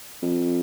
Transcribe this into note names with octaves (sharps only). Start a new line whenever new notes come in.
F2